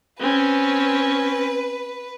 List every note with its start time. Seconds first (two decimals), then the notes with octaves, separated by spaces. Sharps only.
0.20 C4 C#4 B4